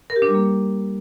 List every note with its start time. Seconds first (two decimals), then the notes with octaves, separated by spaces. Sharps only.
0.10 A#4
0.16 G4
0.22 D4
0.28 G3
0.34 A#3